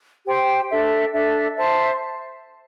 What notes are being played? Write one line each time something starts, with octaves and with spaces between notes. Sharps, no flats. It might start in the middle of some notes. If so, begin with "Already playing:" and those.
G4 C5 G5
D4 A4 E5
D4 A4 E5
C5 E5 A5